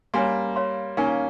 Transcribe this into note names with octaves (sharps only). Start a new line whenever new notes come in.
G3 A#3 C#5 G#5 C6
C#5 F5 C6
A#3 C#4 D#4 A#4 F5 G#5